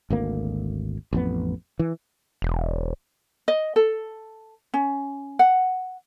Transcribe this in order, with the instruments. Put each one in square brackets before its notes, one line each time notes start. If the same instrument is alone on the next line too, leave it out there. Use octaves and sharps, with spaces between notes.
[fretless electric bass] G#1 D2 A#3
A1 F2 B3
E3
[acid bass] E1
[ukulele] D#5
A4
C#4
F#5